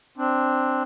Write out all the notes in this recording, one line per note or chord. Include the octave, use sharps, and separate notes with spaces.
C4 D4